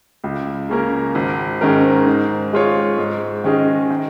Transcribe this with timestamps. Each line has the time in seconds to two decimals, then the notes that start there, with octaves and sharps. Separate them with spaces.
0.24 C#2
0.69 C#3 A#3 C#4 A#4
1.15 G#1
1.61 G#2 D#3 C#4 A#4
2.07 G#2
2.53 G#3 F4 C#5
2.98 G#2
3.44 D#3 C#4 G#4 D#5
3.91 D#3